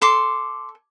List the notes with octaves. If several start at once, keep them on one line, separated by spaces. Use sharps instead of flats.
A4 C6 D6